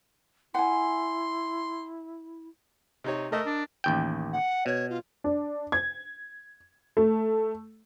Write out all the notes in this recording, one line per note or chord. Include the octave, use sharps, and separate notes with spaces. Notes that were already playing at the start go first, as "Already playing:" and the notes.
E4 F#5 G#5 C6
C3 D#4 C#5
A3 A#4 D#5 E6
D4
A1 D#2 G5
F#5
B2 C#5
F4
D4
G#6
A3